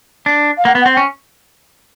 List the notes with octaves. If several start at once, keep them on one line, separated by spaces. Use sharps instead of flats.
D4
F5
A#3 F#5
B3
F#5
C4
G5
C#4